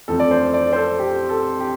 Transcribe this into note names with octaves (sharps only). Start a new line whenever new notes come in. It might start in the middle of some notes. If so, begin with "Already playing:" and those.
F2 F3 A3 C4 A4
D5
C5
D5
C5
A4
G4
A4
G4